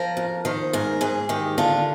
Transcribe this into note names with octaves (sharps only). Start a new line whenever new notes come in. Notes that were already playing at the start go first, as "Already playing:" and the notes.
Already playing: F3 A#4
F2
D#3 C5
G#2 A#4
G#2 G#4
D#3 G4
D3 F4